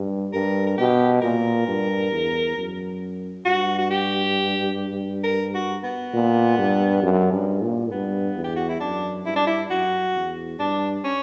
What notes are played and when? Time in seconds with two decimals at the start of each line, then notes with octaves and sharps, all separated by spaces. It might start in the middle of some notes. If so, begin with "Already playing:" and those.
Already playing: G2
0.33 G2 A#4
0.67 A#4
0.78 B2 G4
1.22 A#2 A#4
1.68 G2
2.12 E2
2.57 F#2
3.45 G2 F#4
3.78 F#4
3.90 G4
5.24 A#4
5.54 F#4
5.84 B3
6.13 A#2
6.58 G2
7.02 F#2
7.32 G2
7.62 A#2
7.91 G2 B3
8.36 E2
8.44 G4
8.56 F#4
8.69 E4
8.80 F#2 D4
9.25 G2 E4
9.36 D4
9.47 E4
9.70 F#2 F#4
10.15 E2
10.59 G2 D4
11.04 C#4